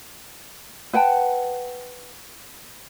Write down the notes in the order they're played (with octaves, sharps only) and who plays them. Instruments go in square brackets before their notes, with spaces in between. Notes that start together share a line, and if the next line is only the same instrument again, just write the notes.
[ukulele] B4 F#5 G5 A5